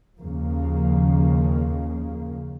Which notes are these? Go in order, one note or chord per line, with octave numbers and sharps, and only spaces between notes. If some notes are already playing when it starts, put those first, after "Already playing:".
D#2 C#3 F3 A#3